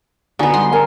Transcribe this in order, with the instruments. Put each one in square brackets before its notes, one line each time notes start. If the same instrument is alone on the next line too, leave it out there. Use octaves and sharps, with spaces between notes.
[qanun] D3 B3 [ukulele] D#4 F#4 G#5
[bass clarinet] G3 [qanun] C6
[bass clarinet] A#4 [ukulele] G#5